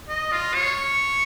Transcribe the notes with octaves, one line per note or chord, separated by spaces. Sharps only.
D#5
F4
C#5